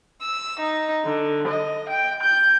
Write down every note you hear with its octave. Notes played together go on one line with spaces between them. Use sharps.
E6
D#4
D3
D#5
G5
G6